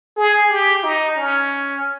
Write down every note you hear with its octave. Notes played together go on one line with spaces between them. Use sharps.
G#4
G4
D#4
C#4